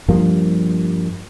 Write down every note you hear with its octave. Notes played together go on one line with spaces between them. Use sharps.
G2 F3 G3 A#3